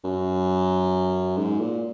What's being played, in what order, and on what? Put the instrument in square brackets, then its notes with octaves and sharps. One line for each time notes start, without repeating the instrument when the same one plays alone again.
[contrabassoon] F#2
G#2
A#2